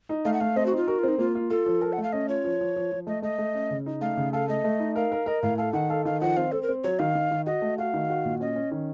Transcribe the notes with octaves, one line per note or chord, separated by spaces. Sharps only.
D#4
A3 F5
F#5
A3 F5
C4 D#5
F#4
D#4
F4
F#4 A#4
F4
C4 D#4
A#3 F4
F4
F4 A4
F3
A4 A#4
F#5
A3
F5
C#4 D#5
F4 C#5
F3
F3
F3
F3
A3 D#5
A3 D#5
A3
C#4
C#3
D#4
A3 F5
C#3
A4 F5
A3 D#5
A3
D#4
A#4 F5
A#4
A#4 D#5
A2 F5
A4 F5
D#3 F#5
A4 F5
D#3 F5
F3 F#5
C4 F5
C4 A4
A#4
C4
F#3 C#5
D#3 F5
D#3
D#3
F#4 D#5
A3
F#4 F5
D#3
F#4
A#2
C#4 D#5
C#4
D#3